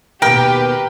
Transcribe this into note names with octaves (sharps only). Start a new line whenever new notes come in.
D#2 B2 G4 A#4 B4 G5